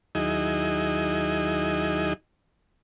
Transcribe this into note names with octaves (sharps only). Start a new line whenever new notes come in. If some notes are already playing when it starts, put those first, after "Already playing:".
D#2 F#3 D#4 E4 G#4 D#5